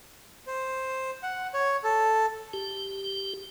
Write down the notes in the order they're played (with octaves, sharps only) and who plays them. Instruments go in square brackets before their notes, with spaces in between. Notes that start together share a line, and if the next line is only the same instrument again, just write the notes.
[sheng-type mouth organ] C5
F#5
C#5
A4
[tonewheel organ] G4